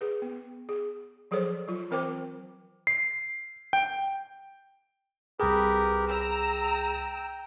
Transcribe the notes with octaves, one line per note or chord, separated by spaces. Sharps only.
G#4 B4
B3
G#4
F3 F#3 G#4 A4 C5 C#5
F#3 F4
E3 C4 A#4 C5 G5 D6
C7
G5
C2 G4 G#4 A#4 B4
G5 A#5 E6